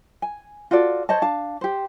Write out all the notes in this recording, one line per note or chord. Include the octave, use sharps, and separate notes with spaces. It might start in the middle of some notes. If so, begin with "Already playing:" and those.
G#5
F4 F#4 A4 D5
C5 C#5 D#5 A5
D4 F5 A5
G4 C5